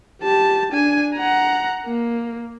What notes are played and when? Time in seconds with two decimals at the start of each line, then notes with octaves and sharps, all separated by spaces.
0.23 G4 A5
0.72 D4 G#5
1.15 F#5 A#5
1.86 A#3